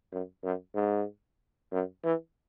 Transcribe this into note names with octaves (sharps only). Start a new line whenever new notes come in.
F#2
F#2
G#2
F#2
E3